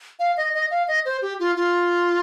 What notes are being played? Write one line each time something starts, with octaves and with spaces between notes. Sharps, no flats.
F5
D#5
D#5
F5
D#5
C5
G4
F4
F4